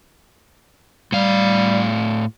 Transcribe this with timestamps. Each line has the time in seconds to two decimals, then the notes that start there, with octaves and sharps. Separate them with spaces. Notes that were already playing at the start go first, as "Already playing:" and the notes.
1.12 A2 G3 F5